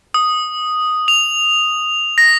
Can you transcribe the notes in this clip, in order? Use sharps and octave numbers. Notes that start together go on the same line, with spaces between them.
D#6
F7
A#6